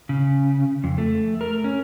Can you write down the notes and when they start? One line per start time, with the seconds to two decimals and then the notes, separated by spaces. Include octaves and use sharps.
0.09 C#3
0.84 F2
0.98 A3
1.41 A#4
1.64 C#4